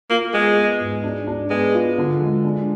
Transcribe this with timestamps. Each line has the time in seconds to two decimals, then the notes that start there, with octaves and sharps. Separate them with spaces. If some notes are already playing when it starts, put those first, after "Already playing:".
0.10 A#3 F4
0.34 G#3 B3
0.56 B3
0.80 G#2
1.04 D4
1.27 D4
1.50 G#3 B3
1.74 F4
1.98 D3
2.20 G#3
2.44 D4